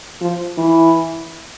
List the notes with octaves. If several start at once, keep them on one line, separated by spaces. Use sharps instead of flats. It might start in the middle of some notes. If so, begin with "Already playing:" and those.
F3
E3